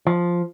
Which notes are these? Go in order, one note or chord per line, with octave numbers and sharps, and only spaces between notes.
F3